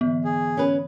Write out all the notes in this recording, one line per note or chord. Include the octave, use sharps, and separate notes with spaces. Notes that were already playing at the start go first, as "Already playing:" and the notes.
G#2 D3 E3 B3
G#4
C#4 B4